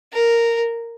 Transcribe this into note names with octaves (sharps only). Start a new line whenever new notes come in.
A#4